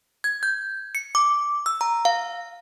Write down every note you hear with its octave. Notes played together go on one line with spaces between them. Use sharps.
G#6
G6
C#7
D6
E6
A#5
F5